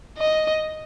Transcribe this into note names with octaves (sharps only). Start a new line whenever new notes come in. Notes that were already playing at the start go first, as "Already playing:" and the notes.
D#5